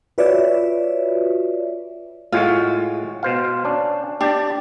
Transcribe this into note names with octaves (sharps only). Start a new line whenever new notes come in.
F4 F#4 B4 C#5 D5 E5
A2 G#3 F4 F#4
B2 C5 F5
C#4 D4
D4 G4 D5